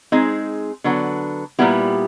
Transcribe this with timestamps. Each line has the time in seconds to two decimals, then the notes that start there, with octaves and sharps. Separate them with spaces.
0.12 G#3 C4 D#4 G#4
0.84 D3 F#3 B3 D4
1.59 A#2 G3 B3 E4 G4